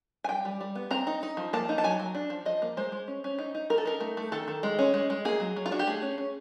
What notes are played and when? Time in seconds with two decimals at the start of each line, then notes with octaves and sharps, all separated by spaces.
0.24 G#5
0.29 G3 G5
0.45 G3
0.61 G3
0.75 B3
0.91 C4 A#5
1.07 D#4
1.23 D#4
1.37 F3
1.53 A#3 A5
1.69 D#4
1.78 A5
1.84 F#3 G#5
1.99 F#3
2.15 D4
2.30 F3
2.46 F3 D#5
2.62 A#3
2.77 G#3 C5
2.92 G#3
3.08 C#4
3.24 C#4
3.39 D#4
3.55 D#4
3.70 D#4 A#4
3.78 A4
3.85 D#4 A#4
4.01 A3
4.17 A3
4.32 D#3 A4
4.48 D#3
4.63 G#3
4.79 C#4
4.94 G#3
5.10 G#3
5.25 A#3 G#4
5.40 F#3
5.56 F#3
5.66 F4
5.71 D4 F#4
5.79 G4
5.87 A3 G#4
6.02 C#4
6.18 C#4